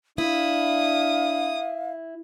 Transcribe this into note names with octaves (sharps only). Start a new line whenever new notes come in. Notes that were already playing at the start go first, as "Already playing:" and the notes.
D4 E4 F5 D#6